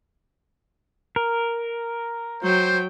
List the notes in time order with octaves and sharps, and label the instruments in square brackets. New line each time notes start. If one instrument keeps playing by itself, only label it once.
[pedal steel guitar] A#4
[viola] F#3 G5 [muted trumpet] C5